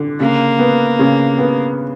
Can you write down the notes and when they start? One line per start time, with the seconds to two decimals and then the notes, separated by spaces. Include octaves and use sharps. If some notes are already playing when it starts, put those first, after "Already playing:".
Already playing: D3
0.20 C#3 A#3
0.59 B3
0.99 C#3
1.38 B3